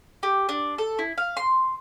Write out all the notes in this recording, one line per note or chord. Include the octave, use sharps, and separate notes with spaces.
G4
D4
A4
E4
F5
C6